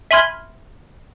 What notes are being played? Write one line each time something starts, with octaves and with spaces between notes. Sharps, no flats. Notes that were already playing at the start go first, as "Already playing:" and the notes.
E5 G#5 B5 C6 F6 G#6